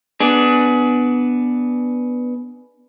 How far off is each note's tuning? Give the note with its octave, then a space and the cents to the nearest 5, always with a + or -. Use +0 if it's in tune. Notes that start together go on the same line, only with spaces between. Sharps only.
B3 +0 D4 +5 G#4 +25